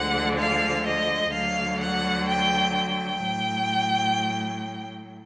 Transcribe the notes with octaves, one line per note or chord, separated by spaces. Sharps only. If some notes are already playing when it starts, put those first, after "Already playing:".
Already playing: D2 D3 F3 G#3 F#5
F5
D#5
D2 D3 F#3 F5
F#5
G5
G5
A2 F#3